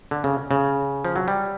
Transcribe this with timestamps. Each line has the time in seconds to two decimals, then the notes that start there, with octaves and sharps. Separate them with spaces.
0.11 D3
0.24 C#3
0.51 C#3
1.05 F3
1.16 F#3
1.28 G3